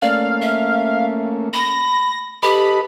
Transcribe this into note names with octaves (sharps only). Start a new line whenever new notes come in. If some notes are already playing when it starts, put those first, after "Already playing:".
A3 A#3 C#4 D5 F5
E5
B5 A#6
G4 A4 B4 D#5 B5